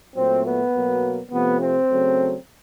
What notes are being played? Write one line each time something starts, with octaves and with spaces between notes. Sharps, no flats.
A#2 F#3 A3 C4
B3
B2 F#3 A#3
C3 F3 A3 B3
C4
C#3 F#3 A3